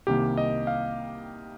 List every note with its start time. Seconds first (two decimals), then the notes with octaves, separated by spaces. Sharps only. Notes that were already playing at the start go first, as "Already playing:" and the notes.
0.07 C2 C3 D#3 A#3 G4
0.37 D#5
0.67 F5